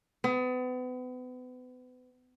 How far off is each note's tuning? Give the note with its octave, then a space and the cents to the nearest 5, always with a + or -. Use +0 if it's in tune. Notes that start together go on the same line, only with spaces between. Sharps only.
B3 +35